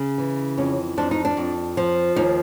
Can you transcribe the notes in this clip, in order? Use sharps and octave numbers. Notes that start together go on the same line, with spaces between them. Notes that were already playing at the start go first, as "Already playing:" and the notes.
Already playing: C#3
E3
F2 C#4
F2 D4
D#4
D4
F2
F3
D#2 D#4